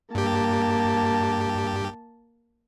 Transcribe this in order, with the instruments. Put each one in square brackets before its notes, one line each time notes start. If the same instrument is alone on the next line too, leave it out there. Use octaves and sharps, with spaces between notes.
[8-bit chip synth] G2 G4 [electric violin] A#3 A5